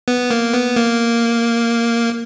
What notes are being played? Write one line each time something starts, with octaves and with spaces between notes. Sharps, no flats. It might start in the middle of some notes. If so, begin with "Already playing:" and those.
B3
A#3
B3
A#3